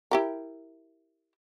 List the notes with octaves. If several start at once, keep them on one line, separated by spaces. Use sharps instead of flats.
E4 G4 A#4